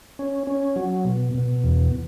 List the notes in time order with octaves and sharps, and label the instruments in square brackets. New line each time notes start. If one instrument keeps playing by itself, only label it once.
[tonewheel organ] C#4
C#4
F#3
B2
B2
E2